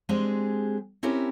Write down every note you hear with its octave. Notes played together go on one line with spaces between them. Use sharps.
G#3 C4 D4 G4 G#4
C4 C#4 E4 G4 A#4